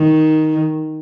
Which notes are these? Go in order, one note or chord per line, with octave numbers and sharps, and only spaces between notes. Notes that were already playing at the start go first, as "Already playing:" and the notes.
Already playing: D#3